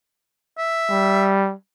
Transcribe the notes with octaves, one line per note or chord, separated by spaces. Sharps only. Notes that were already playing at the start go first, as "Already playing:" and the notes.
E5
G3